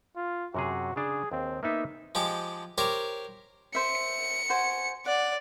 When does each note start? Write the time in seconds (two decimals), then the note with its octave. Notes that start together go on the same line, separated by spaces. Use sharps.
0.16 F4
0.54 F#2 C3 F#4 G#4
0.96 C#3 D4 G#4
1.32 D#2 C4
1.63 A#3 B3 D#4 E5
2.15 F3 G#3 G4 D6
2.78 G4 A#4 C5 C#5
3.75 C5 E5 C#7
4.49 F#4 C5 G#5
5.06 D5 F#5